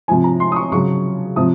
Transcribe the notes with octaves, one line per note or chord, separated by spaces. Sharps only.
C3 F3 G#5
A#5
C6
D#6
C#6
C#3 F#3 C#6
C3 F3 D#6